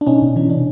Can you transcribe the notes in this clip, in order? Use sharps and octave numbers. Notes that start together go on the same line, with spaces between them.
D4
B2 C#4 D#4
B2
E3 C#4
C3 D4